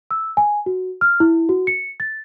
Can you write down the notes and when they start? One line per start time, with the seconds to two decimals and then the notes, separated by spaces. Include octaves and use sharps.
0.11 E6
0.37 G#5
0.66 F#4
1.01 F6
1.20 E4
1.49 F#4
1.67 C#7
2.00 A6